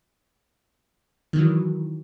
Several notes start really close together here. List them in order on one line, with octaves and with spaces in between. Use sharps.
D#3 E3 F#3